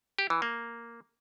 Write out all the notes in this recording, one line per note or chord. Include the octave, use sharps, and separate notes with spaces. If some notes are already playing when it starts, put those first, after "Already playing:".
G4
E3
A#3